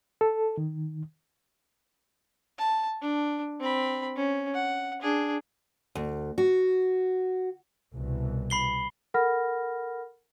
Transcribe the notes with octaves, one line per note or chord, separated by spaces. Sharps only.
A4
D#3
A5
D4
C4 B5
C#4
F#5
D4 G#4
D2
F#4
C2 B2 E3
B5 C7 G7
A4 A#4 F#5 B5 F6 A#6